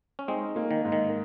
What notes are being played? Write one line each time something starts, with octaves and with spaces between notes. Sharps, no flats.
C#4
G#3 C4 D#4
A#3
D#3
G#2
D#3